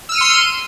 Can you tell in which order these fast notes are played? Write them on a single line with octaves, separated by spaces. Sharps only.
E6 F6 D#7 C#7 C6